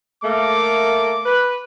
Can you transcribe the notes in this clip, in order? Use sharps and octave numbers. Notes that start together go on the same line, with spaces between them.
A3 A#3 D6
B4